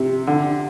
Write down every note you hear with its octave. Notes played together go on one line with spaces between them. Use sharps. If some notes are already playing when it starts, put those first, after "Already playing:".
Already playing: C3
D3